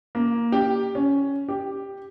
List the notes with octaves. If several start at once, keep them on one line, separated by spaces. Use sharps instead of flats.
A#3
G4
C#4
G4